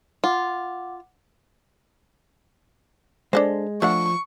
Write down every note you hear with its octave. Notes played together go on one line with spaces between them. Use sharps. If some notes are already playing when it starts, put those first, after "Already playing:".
F4 F#5 D6
G#3 D4 A4 C5
F3 A3 D4 F#5 C#6